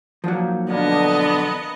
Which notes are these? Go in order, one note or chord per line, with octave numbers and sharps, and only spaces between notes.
A#2 F3 F#3 A#3 D#4
B2 D3 A#3 B3 D4 D#5